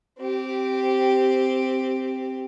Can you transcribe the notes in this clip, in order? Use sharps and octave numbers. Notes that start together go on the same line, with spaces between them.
C4 G4